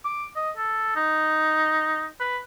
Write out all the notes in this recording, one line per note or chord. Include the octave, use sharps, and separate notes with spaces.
D6
D#5
A4
D#4
B4